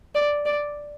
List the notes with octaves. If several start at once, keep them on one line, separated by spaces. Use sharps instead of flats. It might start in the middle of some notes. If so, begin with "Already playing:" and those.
D5
D5